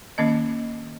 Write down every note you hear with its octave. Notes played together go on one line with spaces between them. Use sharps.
D#3 A#3 C#4 D#5